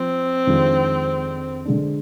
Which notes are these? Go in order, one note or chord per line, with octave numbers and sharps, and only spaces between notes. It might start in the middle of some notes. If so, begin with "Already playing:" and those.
Already playing: F3 C4
F2 D#3 G#3 D4 F4
D3 G#3 D4